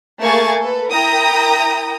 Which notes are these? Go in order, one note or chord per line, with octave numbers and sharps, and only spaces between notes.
A3 A#3 G#4 G#5 C#6 A6
A4 B4
E4 A#4 G5 A#5 D#6